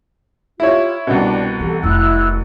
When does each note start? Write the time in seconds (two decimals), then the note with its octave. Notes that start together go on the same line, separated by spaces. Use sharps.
0.60 E4 F4 G4 C#5
1.07 C2 B2 D4 G5
1.60 E3 G4 A4
1.83 F1 F2 E4 E6 F#6